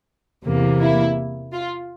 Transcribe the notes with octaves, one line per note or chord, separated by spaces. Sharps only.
E2 C3 E3 A#3
E4
F4